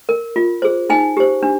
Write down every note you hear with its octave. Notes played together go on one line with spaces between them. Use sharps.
A#4
F4
G#4 C5
D#4 G#5
G4 C5
D4